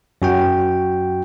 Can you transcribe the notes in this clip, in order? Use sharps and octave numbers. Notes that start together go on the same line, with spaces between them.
F#2 F#4 G5